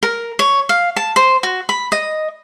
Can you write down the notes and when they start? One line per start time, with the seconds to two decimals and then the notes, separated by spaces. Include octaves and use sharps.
0.03 A#4
0.39 C#5
0.69 F5
0.96 A5
1.16 C5
1.43 F#4
1.69 B5
1.92 D#5